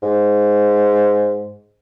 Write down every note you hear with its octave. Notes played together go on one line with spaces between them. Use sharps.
G#2